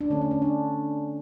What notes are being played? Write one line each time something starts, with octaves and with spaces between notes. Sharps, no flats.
D4
D3 A3 C#4
D4
C#4
D4